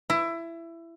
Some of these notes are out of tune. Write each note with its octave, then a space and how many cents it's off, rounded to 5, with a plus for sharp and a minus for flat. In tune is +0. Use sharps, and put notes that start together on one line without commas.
E4 +20